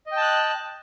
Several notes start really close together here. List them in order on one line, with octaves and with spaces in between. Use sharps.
D#5 G5 A5 F#6